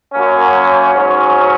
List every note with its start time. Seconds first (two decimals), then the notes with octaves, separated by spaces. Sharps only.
0.13 F#2 F#3 A#3 C#4
0.92 G#2 F#3 C#4